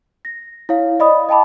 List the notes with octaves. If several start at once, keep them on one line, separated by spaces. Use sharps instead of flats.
A#6
E4 C#5 F5
D5 D#5 B5 D#6
D#5 G5 A5 B5 D6